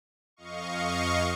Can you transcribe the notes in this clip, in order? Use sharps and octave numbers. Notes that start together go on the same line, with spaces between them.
F2 D#5 F5 C#6